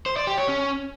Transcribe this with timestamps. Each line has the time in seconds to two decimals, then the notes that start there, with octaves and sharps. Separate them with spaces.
0.06 C5
0.17 D5
0.27 G4
0.38 C#5
0.48 C#4